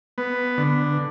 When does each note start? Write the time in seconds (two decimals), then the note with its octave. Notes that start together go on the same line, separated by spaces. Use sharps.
0.18 B3
0.58 D3